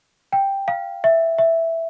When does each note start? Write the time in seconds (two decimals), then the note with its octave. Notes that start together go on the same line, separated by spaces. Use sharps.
0.33 G5
0.68 F5
1.04 E5
1.38 E5